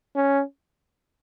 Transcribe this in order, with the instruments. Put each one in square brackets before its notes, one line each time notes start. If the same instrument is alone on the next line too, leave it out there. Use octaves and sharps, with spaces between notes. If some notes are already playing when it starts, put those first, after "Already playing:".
[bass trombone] C#4